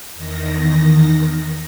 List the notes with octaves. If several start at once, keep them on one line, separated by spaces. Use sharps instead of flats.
E2 D#3 A#6